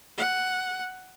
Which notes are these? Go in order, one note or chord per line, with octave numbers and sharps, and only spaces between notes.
F#5